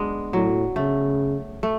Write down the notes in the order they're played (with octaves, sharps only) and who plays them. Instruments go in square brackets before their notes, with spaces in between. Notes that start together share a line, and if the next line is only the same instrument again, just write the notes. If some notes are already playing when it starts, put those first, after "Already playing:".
Already playing: [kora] G#3 B3 D4
[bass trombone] A2 [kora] F#3
[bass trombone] C#3 [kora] A3
[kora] A3